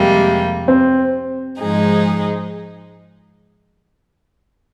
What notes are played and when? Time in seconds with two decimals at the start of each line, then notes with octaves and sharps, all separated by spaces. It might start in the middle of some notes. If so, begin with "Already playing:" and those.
Already playing: F2 C3 G3 G#3 A#3
0.68 C4
1.60 G#2 F3 G#3 D#4 G#4